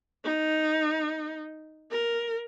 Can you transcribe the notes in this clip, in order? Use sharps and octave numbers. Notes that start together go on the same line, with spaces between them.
D#4
A#4